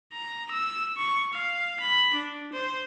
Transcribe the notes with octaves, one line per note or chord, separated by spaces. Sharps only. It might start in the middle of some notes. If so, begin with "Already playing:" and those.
A#5
E6
C#6
F5
B5
D4
C5